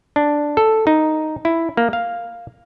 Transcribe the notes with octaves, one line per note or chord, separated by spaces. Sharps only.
D4
A4
D#4
E4
A#3
F5